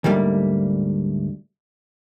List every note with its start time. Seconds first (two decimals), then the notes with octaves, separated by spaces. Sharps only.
0.04 D2 G#2 G3 A3 A#3